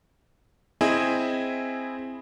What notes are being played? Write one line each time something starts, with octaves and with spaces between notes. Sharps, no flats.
C4 E4 G#4 D#5 E5 G#5